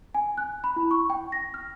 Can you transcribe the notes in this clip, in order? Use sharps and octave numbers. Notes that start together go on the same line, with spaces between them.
G#5
F#6
B5
E4
C#6
G5
A#6
F6